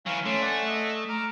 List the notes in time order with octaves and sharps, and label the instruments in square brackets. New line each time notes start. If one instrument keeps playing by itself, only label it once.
[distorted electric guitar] E3 F#3 [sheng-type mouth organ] F5 G#5 C#6
[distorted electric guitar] A3 [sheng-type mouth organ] C#4 C6 D6
[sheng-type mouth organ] D5 F#5 G#5
D#5 E6
A#5 D6 F6